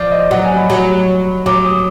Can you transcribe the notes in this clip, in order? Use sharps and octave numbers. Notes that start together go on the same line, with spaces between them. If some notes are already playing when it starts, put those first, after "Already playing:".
Already playing: F3 D5
D#5
F#3 F#5
G#5
B5
F#3
F#3 D6
D#6